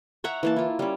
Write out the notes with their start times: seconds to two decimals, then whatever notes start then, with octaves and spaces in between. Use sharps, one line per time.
0.24 C#5 E5 F#5 A#5
0.43 E3 A#3 A5
0.56 E4 F4
0.79 G3 C#4